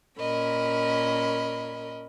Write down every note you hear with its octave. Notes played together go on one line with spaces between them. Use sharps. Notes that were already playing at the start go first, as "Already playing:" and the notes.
A#2 C#4 A#4 D#5 B5